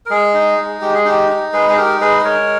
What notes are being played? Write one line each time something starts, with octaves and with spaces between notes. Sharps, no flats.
A#4
G#3 G#4
D#4
G#3
G#3 G4
G#4
D#4 G4
D#4
G#3 G#4 B4
G#4
D#4 G4 A#4
G#3 G#4 B4
D#5
G#3 A#4 C#5